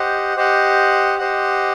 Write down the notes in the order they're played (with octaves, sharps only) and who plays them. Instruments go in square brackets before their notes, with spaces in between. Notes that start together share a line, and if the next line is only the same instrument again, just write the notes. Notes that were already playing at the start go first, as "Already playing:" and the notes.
Already playing: [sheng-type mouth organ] G4 C5 D#5 F#5
G4 C5 D#5 F#5
G4 C5 D#5 F#5